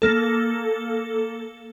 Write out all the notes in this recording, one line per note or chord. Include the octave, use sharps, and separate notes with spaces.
A#3 A4